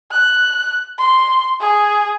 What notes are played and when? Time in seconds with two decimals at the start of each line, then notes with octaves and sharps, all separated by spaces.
0.12 F#6
0.99 C6
1.61 G#4